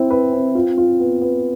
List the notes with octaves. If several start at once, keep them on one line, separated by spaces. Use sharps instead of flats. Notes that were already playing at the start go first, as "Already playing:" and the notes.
Already playing: C4 E4
B4
C4
F4
F4
B3
B3